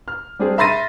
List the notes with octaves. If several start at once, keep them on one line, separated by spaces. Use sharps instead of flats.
F6
G3 C4 D4 G#4
E5 B5 C6 A6 A#6 D#7